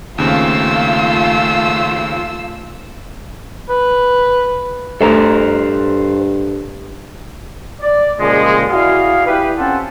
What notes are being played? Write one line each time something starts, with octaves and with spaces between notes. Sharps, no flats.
D#2 C#3 A3 C4 F4 E6
B4
G2 A3 A4 C5 A#5
D5
A#2 C#3 F3 G3 G#3
E4 F#4 G#4 D5 F5
E4 G4 B4
C4 C#4 F4 G4 A4 F#5